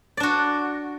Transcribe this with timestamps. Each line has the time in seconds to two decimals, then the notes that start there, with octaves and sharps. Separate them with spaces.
0.17 D5
0.20 D4
0.23 F#4